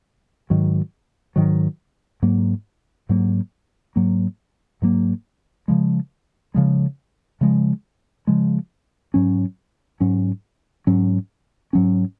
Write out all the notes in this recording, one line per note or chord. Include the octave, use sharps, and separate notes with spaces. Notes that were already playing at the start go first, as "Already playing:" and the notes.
G#2 D#3 F#3
G#2 D#3 F#3
G#2 F#3 A#3
G#2 F#3 A#3
G#2 F#3 A#3
G#2 F#3 A#3
C#3 F3 G#3
C#3 F3 G#3
C#3 F3 G#3
C#3 F3 G#3
G#2 F#3 C#4
G#2 F#3 C#4
G#2 F#3 C#4
G#2 F#3 C#4